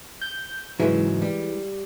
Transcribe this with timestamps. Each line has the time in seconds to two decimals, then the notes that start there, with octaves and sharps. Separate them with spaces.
0.22 G6
0.80 G#2 C#3 E3 F#3 G#3
1.22 G3